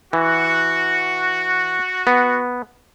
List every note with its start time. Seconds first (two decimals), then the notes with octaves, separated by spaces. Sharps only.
0.13 E3 F#4
2.07 B3